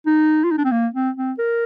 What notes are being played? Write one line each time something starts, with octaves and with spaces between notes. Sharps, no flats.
D#4
F4
D#4
D4
C4
A#3
C4
C4
A#4